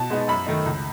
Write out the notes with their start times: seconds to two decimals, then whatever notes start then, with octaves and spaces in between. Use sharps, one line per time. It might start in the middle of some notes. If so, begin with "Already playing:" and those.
Already playing: B2 A5
0.10 G#3 B3 D#4
0.28 F#2 B5
0.46 D#3 A3 D#4
0.66 C#2